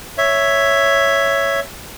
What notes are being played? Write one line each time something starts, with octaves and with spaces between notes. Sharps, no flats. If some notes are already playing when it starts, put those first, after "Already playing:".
C#5 E5